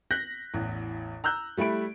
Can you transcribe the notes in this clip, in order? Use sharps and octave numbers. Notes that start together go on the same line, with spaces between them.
F#6 G6 A#6 B6 F#7
A1 E2
A#5 E6 F#6 G6
G3 A3 E4 B5 D7